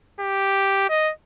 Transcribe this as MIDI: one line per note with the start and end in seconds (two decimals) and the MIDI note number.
0.20 0.88 67
0.89 1.11 75